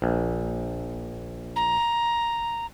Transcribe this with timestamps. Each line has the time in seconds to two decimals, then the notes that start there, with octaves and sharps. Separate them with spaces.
0.02 A#1
1.56 A#5